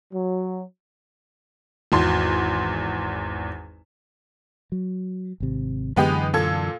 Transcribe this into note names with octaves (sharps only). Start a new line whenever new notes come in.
F#3
G#1 E2 C6
F#3
G#1 C3
F#2 D3 E3 G#3 B3 G4
A#2 A4 G#6